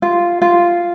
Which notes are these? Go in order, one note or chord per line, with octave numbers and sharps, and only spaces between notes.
F4
F4